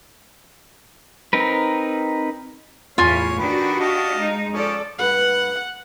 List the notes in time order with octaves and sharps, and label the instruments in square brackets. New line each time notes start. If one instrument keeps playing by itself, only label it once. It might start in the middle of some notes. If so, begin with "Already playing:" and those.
[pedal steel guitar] C4 D#4 A#4 B4
[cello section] E2 A2 F5 [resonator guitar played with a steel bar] F4 G#5 [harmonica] C#5
[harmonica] D#3 B4 [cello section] D4 F#4 G4
[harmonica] D#5 F5 A5
[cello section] G#3 D#4
[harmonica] F3 C#4 [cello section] A4 D5
[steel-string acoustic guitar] G2 B4 [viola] F#5